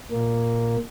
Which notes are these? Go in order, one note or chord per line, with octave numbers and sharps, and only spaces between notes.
A#2 A#3